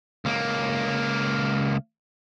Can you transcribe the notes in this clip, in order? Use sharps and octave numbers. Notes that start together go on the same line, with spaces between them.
C#2 A#3